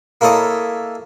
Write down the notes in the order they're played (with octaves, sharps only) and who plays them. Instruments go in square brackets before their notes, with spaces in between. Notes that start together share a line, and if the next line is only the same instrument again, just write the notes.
[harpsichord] A#3 E4 A4 C#5 D#5 A5